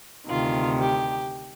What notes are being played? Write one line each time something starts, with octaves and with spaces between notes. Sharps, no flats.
D2 C3 D#3 F4
G4